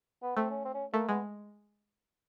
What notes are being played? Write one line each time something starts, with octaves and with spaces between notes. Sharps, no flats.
B3
A3 C4
C#4
C4
C#4
A3 A#3
G#3 B3